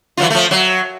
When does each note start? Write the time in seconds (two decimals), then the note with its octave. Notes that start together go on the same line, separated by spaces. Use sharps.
0.17 E3 F#3 F4
0.30 F3 A3
0.51 F#3